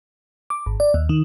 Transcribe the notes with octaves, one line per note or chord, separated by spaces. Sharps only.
D6
G#1
D5
D#2
D#3